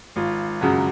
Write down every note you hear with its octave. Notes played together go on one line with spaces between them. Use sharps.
G#1 F4
F#2 C#3 F#3